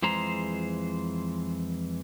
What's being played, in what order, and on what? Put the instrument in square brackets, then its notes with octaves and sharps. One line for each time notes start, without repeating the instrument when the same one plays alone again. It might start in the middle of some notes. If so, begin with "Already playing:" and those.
[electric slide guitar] F2 E3 G#3 G#4 C5 A#5